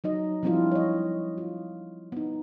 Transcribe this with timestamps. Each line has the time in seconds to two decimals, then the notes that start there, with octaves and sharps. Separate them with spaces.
0.04 F#3 D#4 D#5
0.43 F3 G3 C4 D4 E4 F4
0.72 C#5 D#5
1.38 F4
2.12 B3 D#4